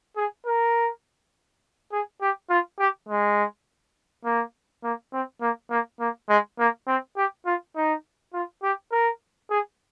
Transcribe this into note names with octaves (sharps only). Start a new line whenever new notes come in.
G#4
A#4
G#4
G4
F4
G4
G#3
A#3
A#3
C4
A#3
A#3
A#3
G#3
A#3
C4
G4
F4
D#4
F4
G4
A#4
G#4